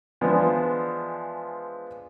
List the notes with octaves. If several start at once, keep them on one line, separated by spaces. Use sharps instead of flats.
E3 F3 G#3 B3 D4